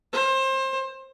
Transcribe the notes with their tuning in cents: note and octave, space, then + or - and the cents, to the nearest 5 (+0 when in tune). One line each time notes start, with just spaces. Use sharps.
C5 +25